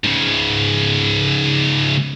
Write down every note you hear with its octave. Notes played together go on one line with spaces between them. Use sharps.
G#2 C#3